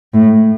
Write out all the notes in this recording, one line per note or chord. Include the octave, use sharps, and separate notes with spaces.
A2